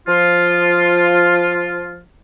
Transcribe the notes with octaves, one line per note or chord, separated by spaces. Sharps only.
F3 F4